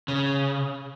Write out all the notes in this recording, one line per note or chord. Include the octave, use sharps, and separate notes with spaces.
C#3